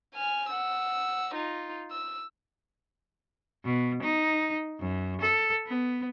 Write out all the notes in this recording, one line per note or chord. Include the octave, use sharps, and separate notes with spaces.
G#5 F6
F#5 E6
D#4 F4
E6
B2
D#4
F#2
A4
B3